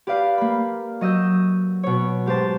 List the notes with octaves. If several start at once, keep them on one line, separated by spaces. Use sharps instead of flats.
G4 B4 D5 F5
A#3 B5
F#3 D#5 E6 G6
B2 C#5
G#2 G4 C5 A5